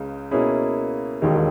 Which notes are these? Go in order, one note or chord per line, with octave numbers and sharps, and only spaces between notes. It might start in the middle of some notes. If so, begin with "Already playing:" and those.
Already playing: C#2 C#3 G#3
B2 A#3 C#4 E4 G#4
E1 D#2 D#3 G#3